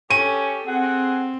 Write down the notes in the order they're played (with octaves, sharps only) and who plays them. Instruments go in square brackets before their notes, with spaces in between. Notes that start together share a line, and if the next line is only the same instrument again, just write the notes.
[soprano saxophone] C#4 [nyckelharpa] G4 A4 [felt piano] D#7
[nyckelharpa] C4 [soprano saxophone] G#4 [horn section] F#5